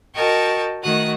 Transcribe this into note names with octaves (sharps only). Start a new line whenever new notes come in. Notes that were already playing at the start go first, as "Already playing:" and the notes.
F#4 A#4 D#5 G5 A5 C#6
D#3 A3 F#4 D#6 F#6